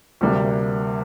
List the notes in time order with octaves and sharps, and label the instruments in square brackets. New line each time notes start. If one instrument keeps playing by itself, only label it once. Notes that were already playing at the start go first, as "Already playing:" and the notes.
[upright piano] D2 C3 G3 A#3